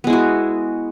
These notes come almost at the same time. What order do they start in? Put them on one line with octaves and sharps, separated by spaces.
B3 G#3 E4 F#4